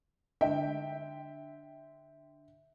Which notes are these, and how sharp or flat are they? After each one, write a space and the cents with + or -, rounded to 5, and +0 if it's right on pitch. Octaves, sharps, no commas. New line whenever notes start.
D3 +5 E5 -10 G5 +0